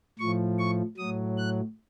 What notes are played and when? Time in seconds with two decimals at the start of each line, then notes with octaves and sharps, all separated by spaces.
0.19 A2 F3 C#6
0.59 C#6
0.98 A2 F#3 D#6
1.38 F#6